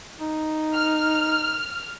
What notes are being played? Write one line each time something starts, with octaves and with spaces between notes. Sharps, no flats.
D#4
F6